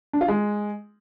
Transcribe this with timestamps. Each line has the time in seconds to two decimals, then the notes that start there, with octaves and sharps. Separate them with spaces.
0.13 D4
0.21 F4
0.28 G#3